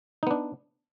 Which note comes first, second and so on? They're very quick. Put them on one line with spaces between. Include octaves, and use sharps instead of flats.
D#4 B3 D4